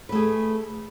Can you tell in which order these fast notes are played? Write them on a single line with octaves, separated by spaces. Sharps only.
B4 A3 G#4